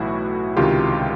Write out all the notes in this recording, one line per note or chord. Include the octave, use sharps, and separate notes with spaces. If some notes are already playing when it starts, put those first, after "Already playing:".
Already playing: B1 A2 E3 E4 F#4
C#2 C3 D#3 F4 G4